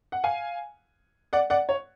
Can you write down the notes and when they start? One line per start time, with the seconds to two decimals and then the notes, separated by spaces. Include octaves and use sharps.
0.12 F#5
0.24 F5 G#5
1.33 D5 F#5
1.50 D5 F#5
1.69 C#5